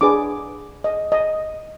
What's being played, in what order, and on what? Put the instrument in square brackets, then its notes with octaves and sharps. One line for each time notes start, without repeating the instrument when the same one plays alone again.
[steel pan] D4 G#4 B4 D6
D#5
D#5